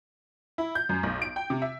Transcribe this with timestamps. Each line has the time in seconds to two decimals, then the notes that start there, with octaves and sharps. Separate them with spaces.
0.58 E4
0.75 G6
0.89 F#2
1.03 B1
1.22 D7
1.36 G5
1.50 C3
1.62 E5